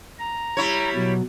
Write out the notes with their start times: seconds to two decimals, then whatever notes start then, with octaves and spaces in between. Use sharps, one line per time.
0.19 A#5
0.57 G3 E4 C#5
0.95 B2 F#3